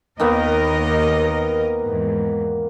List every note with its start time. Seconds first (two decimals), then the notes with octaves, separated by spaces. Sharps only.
0.20 D#2 D#3 A#3 B3 A#4 D#5
1.81 E2 G#2